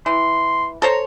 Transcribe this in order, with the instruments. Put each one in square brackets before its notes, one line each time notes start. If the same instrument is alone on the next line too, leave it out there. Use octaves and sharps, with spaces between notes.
[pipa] E3 [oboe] C6
[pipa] A4 C5 C#5 [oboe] A#5